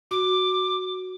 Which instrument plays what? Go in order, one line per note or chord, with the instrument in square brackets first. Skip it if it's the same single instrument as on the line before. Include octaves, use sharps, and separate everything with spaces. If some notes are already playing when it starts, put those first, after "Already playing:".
[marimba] F#4 [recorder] D6